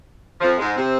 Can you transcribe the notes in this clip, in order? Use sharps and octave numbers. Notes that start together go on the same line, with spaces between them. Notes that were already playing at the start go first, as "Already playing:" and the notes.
F2 F3
G#2 G#3
C3 C4